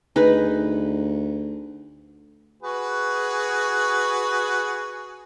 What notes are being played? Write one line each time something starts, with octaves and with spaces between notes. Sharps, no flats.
D2 D#4 G#4 B4
F#4 G#4 B4